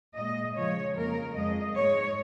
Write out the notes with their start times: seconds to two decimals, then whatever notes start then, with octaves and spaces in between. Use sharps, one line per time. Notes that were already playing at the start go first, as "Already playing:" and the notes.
0.16 A#2 G#3 D#5
0.56 C#3 F3 G#3 C#5
0.96 F2 C#3 F3 A#3 A#4
1.35 F2 F3 G#3 D#5
1.75 G#2 G#3 C#5